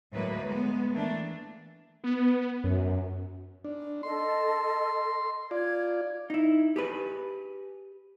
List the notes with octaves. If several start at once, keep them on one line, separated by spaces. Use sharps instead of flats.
D2 A2 F#3 G#3 A#3 B4
G#3 B3
E3 A3 A#3 D4
B3
F#2
D4
A4 D#5 C6
F4 D5 G#6
D#4 E4
G4 G#4 B4